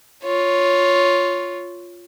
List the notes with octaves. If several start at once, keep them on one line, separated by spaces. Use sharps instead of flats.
F4 C#5